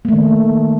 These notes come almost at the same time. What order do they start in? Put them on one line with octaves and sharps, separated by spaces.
A#3 A3 D#3